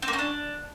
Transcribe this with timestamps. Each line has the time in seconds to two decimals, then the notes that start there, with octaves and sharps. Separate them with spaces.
0.02 C4
0.08 A#3
0.13 C#4
0.19 D4